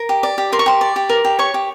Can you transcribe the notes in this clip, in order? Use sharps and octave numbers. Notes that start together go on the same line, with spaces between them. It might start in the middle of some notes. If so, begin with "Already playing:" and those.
Already playing: A#4
G4
D5
G4
A#4 C6
C#6
G4 C6
D5
G4
A#4
G4
C#5 C#6
G4